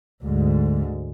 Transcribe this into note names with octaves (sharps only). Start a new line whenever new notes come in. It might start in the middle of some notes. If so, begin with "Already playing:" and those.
D2 G#2